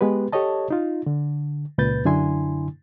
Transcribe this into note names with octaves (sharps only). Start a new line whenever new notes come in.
G#3 B3 G4 B4
G4 A4 C#5 D#5 A5
D#4 F4
D3
C#2 A#2 B4 G6 A6
F#2 D3 D4 E4 G#5 C6